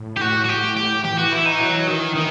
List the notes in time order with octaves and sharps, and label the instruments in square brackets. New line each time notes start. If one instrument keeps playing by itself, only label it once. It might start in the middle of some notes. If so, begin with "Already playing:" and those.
Already playing: [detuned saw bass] A2
[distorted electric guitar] G4
F#4
F#4
G4
G4
[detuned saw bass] E3 [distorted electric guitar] G4
[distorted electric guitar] F#4
E4
D#4
F#3
D#3
[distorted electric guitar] D#3 [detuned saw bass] E3